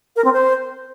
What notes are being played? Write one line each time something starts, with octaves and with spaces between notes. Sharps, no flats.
A#4
C4
C5